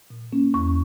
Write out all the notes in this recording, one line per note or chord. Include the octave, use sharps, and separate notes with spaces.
A#2
A#3 C#4
E2 C#6